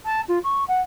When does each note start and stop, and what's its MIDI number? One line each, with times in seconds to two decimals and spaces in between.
0.05 0.21 81
0.28 0.38 65
0.43 0.63 85
0.68 0.80 78